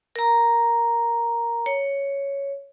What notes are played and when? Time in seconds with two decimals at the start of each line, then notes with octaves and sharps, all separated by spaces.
0.16 A#4 A#5
1.66 C#5